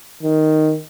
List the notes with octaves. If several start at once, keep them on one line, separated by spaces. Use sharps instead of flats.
D#3